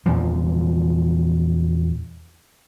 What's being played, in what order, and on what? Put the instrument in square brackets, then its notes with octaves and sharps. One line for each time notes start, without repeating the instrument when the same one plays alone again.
[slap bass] E2 A#2 E3 F3